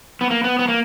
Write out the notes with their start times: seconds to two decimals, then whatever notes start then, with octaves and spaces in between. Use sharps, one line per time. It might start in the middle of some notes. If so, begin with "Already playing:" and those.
0.21 B3
0.31 A#3
0.44 B3
0.59 B3
0.68 A#3